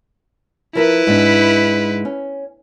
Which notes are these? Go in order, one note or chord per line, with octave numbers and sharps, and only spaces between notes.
F3 E4 A#4 B4 E5
G#2 G#3 D4
C#4